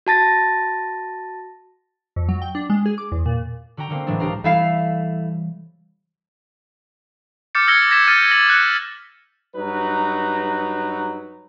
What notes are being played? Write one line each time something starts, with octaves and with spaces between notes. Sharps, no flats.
F#4 A5 A6 A#6
F2
F#3
G5
D4
G#3
G#4
D6
E2
A#2
D3 F#4 G5 A#5
D3 A#3 C4
A2 E3 F#3 G#3 D4
C#2 D4 G4 A#4 F5 A#5
E3 G3 A3 E4 F5
D6 F6 G6 A6 C#7
E6 F6 G#6 A#6 C#7 G7
G#6 A#6 B6 E7
F6 G6 A6 D#7
E6 A#6 F#7
F#6 G6 C#7
G2 F#3 D#4 B4 A#5